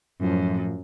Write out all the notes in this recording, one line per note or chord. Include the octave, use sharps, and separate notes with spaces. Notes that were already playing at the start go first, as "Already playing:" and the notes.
F#2 A2 F3